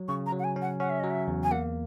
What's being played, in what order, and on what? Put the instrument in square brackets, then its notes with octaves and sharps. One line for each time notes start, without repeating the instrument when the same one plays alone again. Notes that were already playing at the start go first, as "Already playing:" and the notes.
Already playing: [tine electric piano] F#3
[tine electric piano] C#3 [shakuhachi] C#6
[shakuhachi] A#5
[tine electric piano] F#3
[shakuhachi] F#5
G#5
[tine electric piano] C#4
[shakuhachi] F#5
[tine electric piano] C#4 [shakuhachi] F#5
[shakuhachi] E5
[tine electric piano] F#3 [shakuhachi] D#5
[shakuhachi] E5
[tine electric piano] E2
[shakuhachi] G#5
[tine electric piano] A#3 [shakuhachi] F#5